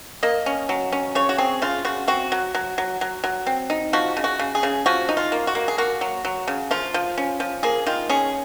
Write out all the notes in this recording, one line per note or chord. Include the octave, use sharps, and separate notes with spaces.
A#3 D#5
C#4
F#3
C#4
C#3 C#5
F#4
C4 G#4
C#3 F4
C#3 F#4
C4 F#4
F#3
F#3
F#3
F#3
F#3
C4
D#4
F3 F#4
C#3
F#4
C#3
G#4
C#3
F3 F#4
D#4
F4
A#3
F#4
A#3
G#4
A#3 F#4
F#3
F#3
C#3
F3 F4
F3
C#4
F3
A#3 G#4
D#3 F4
C#4 G#4